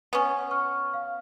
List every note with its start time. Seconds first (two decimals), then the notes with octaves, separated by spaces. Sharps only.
0.13 B3 C#4
0.51 C#6 F6
0.94 F5